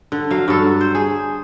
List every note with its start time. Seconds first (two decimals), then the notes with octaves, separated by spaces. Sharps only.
0.12 D3
0.31 F#3 F5
0.48 G2 F#3 A4
0.81 C5
0.95 G#4